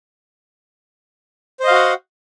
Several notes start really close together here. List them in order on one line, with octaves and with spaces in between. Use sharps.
C5 D#5 F5 F#4 F#5